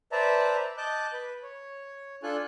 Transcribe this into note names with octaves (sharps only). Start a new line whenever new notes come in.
B4 C5 D5 E5 A5 A#5
D#5 A5 D6 F#6 G6
B4
C#5
D4 F4 A4 G#5 F#6